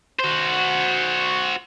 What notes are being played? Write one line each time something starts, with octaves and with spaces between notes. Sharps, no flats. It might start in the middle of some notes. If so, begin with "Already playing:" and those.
F#4 C5